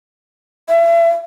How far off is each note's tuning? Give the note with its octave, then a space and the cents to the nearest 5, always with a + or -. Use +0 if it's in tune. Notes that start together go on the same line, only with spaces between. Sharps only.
E5 +35